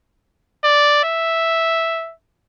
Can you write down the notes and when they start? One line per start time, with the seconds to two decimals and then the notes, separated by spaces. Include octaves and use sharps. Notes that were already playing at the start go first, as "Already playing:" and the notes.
0.64 D5
1.04 E5